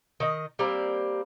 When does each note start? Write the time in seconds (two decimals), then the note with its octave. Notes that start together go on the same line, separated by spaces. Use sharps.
0.20 D#3 D#5
0.59 G3 A#3 C4 A#4